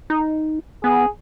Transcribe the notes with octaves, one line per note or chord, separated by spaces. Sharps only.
D#4
B3 G#4